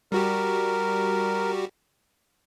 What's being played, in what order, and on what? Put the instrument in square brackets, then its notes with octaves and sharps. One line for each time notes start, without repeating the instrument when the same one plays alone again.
[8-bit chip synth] G3 F#4 G4 [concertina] A#4